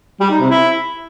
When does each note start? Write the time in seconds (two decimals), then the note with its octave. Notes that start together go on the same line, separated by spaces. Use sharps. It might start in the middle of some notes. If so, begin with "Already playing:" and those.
0.20 G3
0.30 D#4
0.40 C3
0.50 E4